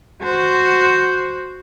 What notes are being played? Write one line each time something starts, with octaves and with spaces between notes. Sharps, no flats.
F#4 C5